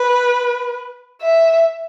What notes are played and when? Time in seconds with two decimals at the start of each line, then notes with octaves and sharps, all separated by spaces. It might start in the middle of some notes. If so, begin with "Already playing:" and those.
Already playing: B4
1.22 E5